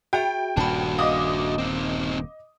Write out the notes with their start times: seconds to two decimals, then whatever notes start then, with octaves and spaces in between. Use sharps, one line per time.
0.13 F#4 G#4 E5 G5
0.57 D#1 G2 A#2 D4 F#4 A5 B5
0.99 D#5 F5 D6 D#6
1.58 C4 D#4